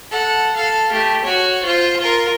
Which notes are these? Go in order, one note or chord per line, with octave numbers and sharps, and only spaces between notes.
A4 F#5
A4 F5
A3 G4
F#4 C#5
F4 C5
F4 A#4